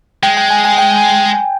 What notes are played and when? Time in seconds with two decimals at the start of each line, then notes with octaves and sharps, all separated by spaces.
0.23 G#3 G5
0.37 G5
0.50 G#5
0.65 G#5
0.78 G5